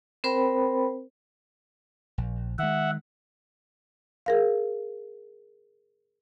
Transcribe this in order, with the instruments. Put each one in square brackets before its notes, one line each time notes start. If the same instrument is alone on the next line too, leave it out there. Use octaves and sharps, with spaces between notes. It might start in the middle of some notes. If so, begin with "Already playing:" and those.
[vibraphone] C4 A#4 C5 G5 B5
[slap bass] A#1
[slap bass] D#3 G#3 [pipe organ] E5 F#5
[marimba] G#4 A#4 F5